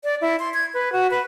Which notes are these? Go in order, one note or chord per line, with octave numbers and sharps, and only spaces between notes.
D5
E4
C6
G#6
B4
F#4
B4